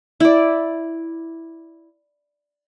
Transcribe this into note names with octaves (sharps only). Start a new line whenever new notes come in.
E4 D5